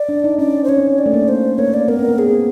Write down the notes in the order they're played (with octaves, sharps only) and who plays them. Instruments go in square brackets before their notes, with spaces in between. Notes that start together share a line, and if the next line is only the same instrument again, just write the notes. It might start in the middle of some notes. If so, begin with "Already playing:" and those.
Already playing: [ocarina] D5
[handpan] D4
D#4
[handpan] C#4 [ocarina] D5
[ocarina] C5
[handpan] C#4 [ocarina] C#5
[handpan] C4
[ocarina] D5
[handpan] A3
A#3
[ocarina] C5
[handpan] A#3 [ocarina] C#5
[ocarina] D5
[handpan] B3 [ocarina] A#4
[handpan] C4
A#3
[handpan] B3 [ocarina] G#4
[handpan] B3